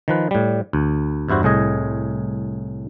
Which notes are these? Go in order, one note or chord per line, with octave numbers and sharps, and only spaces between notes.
D#3 F3 B4
A2 G3
D2
E2 G2 E4 F#4 C5
C2 A2 G#4 D#5